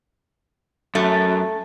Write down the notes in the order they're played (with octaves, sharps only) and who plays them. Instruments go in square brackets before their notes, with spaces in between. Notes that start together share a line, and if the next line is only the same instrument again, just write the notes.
[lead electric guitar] F#2 [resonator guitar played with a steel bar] A3